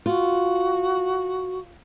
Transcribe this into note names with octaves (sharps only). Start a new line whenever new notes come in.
F4 F#4